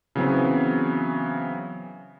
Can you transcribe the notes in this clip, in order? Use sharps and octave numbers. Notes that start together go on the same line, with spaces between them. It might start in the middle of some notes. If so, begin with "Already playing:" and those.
C#3 E3 F#3 B3 C4